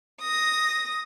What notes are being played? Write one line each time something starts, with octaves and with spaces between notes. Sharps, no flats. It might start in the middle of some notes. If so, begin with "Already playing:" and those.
D#6 A#6